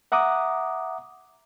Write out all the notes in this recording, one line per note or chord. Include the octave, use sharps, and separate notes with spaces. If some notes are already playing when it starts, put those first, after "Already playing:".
E5 F#5 A#5 D6 D#6